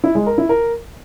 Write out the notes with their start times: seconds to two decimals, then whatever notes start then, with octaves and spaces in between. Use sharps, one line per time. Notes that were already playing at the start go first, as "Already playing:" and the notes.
0.04 E4
0.15 G#3
0.26 A#4
0.38 E4
0.49 A#4